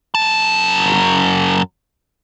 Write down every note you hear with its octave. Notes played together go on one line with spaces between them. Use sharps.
F#2 A5